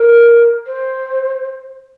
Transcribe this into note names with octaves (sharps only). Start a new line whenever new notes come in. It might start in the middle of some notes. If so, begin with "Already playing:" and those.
Already playing: A#4
C5